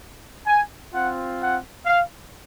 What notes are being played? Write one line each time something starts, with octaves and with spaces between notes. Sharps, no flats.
G#5
C4 F4 F#5
F#5
F5